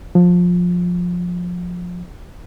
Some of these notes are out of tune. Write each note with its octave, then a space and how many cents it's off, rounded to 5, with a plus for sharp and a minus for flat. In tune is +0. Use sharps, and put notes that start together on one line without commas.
F3 +20